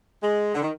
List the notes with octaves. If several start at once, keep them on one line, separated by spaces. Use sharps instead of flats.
G#3
D3
D#3